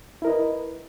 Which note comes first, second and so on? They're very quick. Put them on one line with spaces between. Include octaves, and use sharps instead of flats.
E4 A#4 D#5 B4